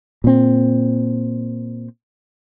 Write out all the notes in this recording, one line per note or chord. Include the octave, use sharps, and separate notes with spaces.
A#2 C4